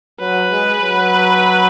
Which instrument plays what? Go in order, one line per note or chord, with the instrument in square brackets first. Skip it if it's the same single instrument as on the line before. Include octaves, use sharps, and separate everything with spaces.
[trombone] F#3 [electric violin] B4
[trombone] G#3
F#3